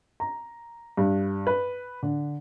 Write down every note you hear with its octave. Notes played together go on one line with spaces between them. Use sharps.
A#5
G2
B4
D3